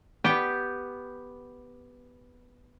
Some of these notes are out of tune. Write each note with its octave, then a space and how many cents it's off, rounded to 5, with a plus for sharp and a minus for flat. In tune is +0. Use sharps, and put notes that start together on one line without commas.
B3 +0 G4 +0 G5 +0